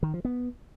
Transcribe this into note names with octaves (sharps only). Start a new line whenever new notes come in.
D#3
F3
B3